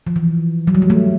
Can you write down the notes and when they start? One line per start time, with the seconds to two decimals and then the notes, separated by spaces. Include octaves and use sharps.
0.07 F3
0.16 E3
0.67 F#3
0.75 G3
0.82 G#3
0.90 A3